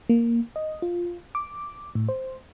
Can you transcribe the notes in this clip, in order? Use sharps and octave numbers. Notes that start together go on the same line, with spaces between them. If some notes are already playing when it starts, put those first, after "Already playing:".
A#3
D#5
F4
D6
A2
C5